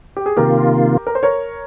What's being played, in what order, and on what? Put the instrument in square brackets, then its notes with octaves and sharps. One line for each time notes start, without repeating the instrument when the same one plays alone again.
[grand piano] G4
G#4
[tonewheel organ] C3 D#3 A#3 F4 [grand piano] G4 A#4
[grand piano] A#4
C5
A#4 C#5